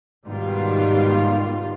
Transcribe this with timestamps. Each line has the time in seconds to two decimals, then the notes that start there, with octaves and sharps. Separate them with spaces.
0.25 G#2 B2 D#3 G3 B3 F4